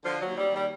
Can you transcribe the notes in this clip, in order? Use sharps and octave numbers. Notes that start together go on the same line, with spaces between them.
D3 F3
F#3
D#2
G3
D#2 G3